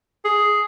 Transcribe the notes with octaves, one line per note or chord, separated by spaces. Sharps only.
G#4